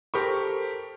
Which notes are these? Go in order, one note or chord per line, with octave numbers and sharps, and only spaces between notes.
G4 A4 A#4 C5 B5 C#6